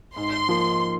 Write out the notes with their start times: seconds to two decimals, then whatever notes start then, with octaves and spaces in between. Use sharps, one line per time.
0.16 G#2 C6
0.49 F3 A#3